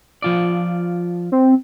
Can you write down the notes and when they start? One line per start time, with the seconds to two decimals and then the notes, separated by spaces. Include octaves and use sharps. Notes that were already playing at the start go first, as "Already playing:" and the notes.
0.22 F3 F4 D5
1.32 C4